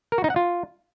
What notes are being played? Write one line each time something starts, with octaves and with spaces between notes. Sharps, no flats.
A#4
F#4
D#4
F#5
F4